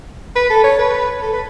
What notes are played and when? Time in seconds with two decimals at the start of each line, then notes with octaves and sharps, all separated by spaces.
0.36 B4
0.50 A4
0.64 C#5
0.78 B4
1.22 A4
1.33 B4